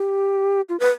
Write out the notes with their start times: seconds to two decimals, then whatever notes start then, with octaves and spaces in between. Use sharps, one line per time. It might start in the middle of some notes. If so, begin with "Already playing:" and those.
Already playing: G4
0.69 F4
0.80 B4